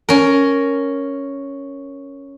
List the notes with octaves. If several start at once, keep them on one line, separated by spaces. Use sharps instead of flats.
C#4 A#4